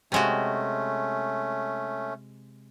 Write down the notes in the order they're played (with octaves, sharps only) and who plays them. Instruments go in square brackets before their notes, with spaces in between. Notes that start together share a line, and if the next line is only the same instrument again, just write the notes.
[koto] C3 G#3 F#4 [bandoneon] A3 C#4